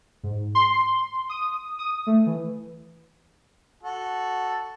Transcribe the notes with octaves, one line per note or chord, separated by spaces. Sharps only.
G#2
C6
D#6
D#6
A3
E3
F#4 A4